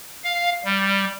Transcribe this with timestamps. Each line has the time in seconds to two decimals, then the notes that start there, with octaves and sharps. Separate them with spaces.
0.24 F5
0.64 G3